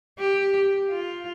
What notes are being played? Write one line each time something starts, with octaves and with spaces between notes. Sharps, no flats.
G4
F4